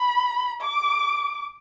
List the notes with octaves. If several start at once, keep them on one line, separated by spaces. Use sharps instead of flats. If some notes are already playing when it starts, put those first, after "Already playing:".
Already playing: B5
D6